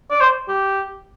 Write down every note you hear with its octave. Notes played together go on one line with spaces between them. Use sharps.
D5
C5
G4